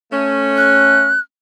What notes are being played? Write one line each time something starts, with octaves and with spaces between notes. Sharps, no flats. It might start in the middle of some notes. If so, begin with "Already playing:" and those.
A3 C#4
F#6